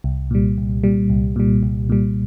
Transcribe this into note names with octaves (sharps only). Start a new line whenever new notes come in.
C2
A#2 G3
C2
A#2 G3
C2
A#2 G3
C2
A#2 G3